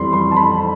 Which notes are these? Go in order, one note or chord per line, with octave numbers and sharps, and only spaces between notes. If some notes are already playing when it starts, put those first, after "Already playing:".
Already playing: F2 E3 G3 B5 C6
C6
A5
B5